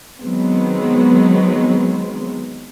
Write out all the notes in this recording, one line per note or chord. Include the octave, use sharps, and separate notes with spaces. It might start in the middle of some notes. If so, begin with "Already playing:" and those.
D#3 F#3 G#3 B3 C4